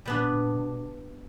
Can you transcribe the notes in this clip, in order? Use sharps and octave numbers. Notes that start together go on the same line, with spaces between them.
A#2 G3 B3 D4
A#2
B2